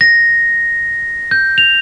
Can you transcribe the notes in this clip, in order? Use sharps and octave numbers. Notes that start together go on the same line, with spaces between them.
A#6
G6
F7